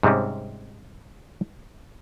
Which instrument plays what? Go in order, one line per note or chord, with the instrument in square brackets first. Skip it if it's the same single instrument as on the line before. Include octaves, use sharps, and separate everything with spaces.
[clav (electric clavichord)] G#2 C3 G3 C4 C#4